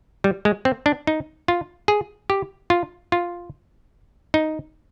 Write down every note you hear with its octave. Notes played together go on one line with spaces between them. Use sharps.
G3
G#3
C4
D4
D#4
F4
G#4
G4
F4
F4
D#4